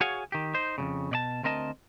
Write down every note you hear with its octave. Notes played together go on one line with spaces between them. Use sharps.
F#4 G#4 C#5 F5 F#5 G#5
D#3 G4
D#4 C5
F2 A#2 C#3
B2 D5 A5
D2 C4 A#4 D#5 A5